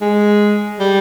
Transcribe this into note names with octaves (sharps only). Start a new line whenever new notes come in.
G#3
G3